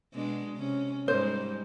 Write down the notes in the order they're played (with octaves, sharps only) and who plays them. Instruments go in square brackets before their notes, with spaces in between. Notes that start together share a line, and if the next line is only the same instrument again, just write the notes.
[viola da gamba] B2 G#3 D4
C3 C#4
[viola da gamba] G#2 G3 G#3 [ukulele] C5